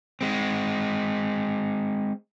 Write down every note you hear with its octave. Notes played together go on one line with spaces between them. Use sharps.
G#3 C4